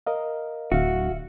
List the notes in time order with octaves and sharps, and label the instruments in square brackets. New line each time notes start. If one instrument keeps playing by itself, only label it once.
[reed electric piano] A#4 D#5 F5
[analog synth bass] D1 [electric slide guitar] F#4 [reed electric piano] E5 F5